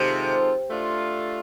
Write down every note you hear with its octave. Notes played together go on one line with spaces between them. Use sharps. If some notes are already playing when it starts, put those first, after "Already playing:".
Already playing: C3 D#3 G#3 C4 F4 A4
A3 D4 F4